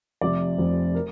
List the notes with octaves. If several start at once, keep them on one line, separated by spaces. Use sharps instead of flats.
F1 F2 C3 D5
F1 F2 C3 C5
A#4